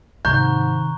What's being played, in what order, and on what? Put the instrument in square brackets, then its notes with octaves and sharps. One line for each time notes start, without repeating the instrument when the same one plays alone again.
[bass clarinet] G#2 [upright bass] C3 D#3 [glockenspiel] A#5 C#6 F#6 [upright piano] G6